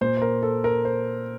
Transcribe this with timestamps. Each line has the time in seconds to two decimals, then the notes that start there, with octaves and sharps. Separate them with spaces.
0.01 A#2 C5
0.17 C5
0.22 A#4
0.42 A4
0.64 A#4
0.85 C5